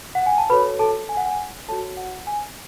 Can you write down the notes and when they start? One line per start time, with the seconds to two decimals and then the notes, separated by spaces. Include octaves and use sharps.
0.15 F#5
0.26 G#5
0.38 A5
0.50 F#4 A4 B4 C#5 B5
0.79 A4 A5
1.09 G#5
1.17 F#5
1.26 G#5
1.68 F#4 A4 C#5 A5
1.97 F#5
2.27 G#5